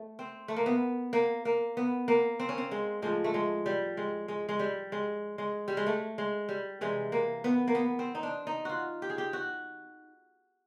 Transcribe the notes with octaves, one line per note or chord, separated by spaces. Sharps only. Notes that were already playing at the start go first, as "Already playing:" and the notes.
Already playing: A3
C4
A3
A#3
B3
A#3
A#3
B3
A#3
C4
C#4
C4
G#3
A2 F3 G#3
A3
G#3
G3
G#3
G#3
G#3
G3
G#3
G#3
G3
G#3
A3
G#3
G3
C3 E3 G3 G#3
A#3
B3
A#3
B3
C4
D#4
D4
D#4
F4 F#4
G4
G#4
G4
F#4